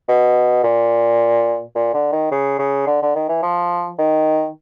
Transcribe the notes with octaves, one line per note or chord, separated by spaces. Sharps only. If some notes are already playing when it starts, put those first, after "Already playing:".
B2
A#2
A#2
D3
D#3
C#3
C#3
D3
D3
D#3
E3
F3
D#3